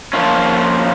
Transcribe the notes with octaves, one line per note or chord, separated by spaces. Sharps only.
F3 A#3 C#4 F4